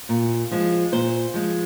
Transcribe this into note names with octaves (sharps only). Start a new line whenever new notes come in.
A#2
F3 G#3
A#2 C5
F3 G#3